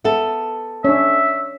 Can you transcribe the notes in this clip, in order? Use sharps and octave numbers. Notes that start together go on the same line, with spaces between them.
B3 A4 E5 A5
C#4 D4 C#5 E5